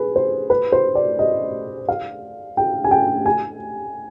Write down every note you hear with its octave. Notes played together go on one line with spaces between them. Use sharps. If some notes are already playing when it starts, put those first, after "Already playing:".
Already playing: G#4 B4
C5
B4
C5
D5
D#5
F5
G5
G#5
G5
G#5